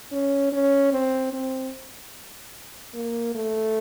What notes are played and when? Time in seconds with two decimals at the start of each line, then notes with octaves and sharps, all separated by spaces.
0.12 C#4
0.52 C#4
0.93 C4
1.33 C4
2.94 A#3
3.35 A3